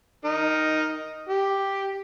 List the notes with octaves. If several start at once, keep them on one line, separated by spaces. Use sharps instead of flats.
D#4 A#4
G4